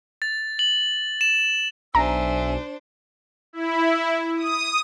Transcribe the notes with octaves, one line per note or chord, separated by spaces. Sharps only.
A6
F#7
E7
B1 D4 C5 E5 G#5 A#5 E6
E4
D#6